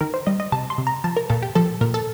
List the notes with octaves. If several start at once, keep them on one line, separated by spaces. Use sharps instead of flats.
D#3 A#4
C5
G3 D#5
D#5
C3 A5
C6
C3
A#5
F3 A5
A#4
A#2 A4
G4
F3 A4
A#2 A#4
A4